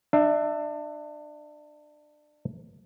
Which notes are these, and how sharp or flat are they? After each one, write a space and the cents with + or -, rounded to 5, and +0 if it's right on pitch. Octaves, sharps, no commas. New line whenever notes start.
D4 +25 E5 +0